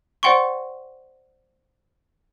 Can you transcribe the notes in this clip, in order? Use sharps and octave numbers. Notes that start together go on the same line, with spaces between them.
C5 D5 F#5 G5 C6 C#6